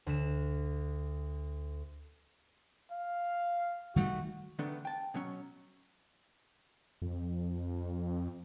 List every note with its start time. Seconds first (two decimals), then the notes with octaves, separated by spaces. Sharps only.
0.06 D2 E7
2.92 F5
3.96 D#3 G3 A3 F#4
4.59 D3 D#3 A3 B3 D4
4.85 G5 A5
5.14 B2 F#3 C#4
7.02 F2